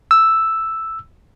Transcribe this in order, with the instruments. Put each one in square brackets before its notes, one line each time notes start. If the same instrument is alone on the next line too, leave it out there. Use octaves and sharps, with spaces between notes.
[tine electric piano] E6